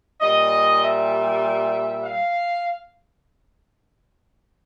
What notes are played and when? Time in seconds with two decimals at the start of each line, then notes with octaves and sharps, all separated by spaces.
0.22 A#2 G3 D#5
0.82 E5
2.03 F5